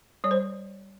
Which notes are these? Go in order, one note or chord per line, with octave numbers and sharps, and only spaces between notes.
G3 C#5
C5